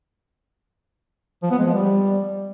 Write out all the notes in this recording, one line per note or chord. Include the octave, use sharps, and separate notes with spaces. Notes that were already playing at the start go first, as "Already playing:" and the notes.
F3
B3
G#3
F3
G3